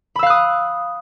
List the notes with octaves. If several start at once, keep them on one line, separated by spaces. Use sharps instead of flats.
F5 B5 D#6 E6 F#6